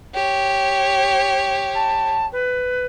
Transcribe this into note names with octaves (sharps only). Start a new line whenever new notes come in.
G4 C#5
A5
B4